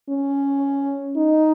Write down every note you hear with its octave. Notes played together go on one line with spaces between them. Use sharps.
C#4
D#4